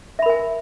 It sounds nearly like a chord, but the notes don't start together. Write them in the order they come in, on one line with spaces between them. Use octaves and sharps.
E5 B5 A#4 G#5